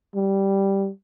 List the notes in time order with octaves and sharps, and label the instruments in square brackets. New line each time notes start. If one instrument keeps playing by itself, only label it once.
[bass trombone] G3